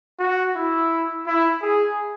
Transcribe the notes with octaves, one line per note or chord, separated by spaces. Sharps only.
F#4
E4
E4
G#4